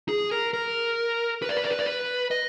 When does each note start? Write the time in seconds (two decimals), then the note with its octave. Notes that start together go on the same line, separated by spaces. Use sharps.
0.09 G#4
0.31 A#4
0.54 A#4
1.42 B4
1.49 D5
1.57 B4
1.64 D5
1.71 B4
1.79 D5
1.86 B4
2.31 D#5